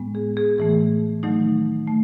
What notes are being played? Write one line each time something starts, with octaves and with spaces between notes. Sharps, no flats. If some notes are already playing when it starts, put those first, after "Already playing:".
Already playing: A2 G#3 B3
G#4
G#4
A2 E3 A3 G#4
D#3 F#3 A3 D#4
A3